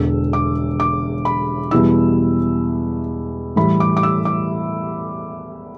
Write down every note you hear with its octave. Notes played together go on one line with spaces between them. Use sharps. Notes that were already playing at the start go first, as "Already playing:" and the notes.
Already playing: E1 E2 D3 E6
D6
D6
B5
E2 B2 G3 E4 E6
A2 E3 G3 E4 B5
D6
D6
E6
D6